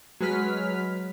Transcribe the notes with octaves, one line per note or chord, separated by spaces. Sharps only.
F#3 G#3 B4 F6 B6